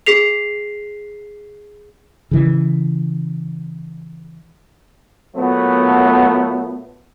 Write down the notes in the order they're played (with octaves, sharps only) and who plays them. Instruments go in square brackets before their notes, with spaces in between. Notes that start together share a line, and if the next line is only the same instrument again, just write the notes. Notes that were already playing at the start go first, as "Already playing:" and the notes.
[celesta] G#4 B6 C7 F7
[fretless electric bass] C#3 E3
[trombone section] A#2 F#3 A3 B3